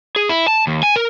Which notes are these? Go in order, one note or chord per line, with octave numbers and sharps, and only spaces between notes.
G#4
E4
A5
D#2
G#5
A#4